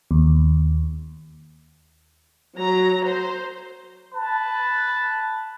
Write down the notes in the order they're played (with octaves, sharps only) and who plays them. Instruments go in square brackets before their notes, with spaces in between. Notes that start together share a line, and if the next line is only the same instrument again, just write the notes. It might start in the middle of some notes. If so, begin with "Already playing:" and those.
[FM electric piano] D#2
[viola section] F#3 A#5
C5
[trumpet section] B4 A5